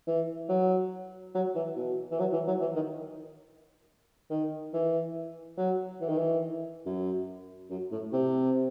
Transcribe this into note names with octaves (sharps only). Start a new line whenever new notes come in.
E3
F#3
F#3
E3
B2
E3
F#3
E3
F#3
E3
D#3
D#3
E3
F#3
E3
D#3
E3
F#2
F#2
A2
C3